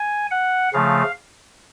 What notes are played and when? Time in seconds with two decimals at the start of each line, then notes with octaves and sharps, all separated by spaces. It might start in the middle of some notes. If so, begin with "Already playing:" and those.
Already playing: G#5
0.31 F#5
0.73 C#3 F3 A3 F5